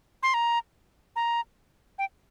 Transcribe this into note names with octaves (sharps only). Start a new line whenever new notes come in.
C6
A#5
A#5
G5